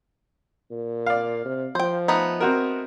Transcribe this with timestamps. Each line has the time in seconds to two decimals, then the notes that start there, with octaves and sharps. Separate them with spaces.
0.71 A#2
1.06 D5 F5
1.45 C3
1.75 F3 C5 G5
2.08 A3 B3 D#4
2.40 C4 F#4 A#4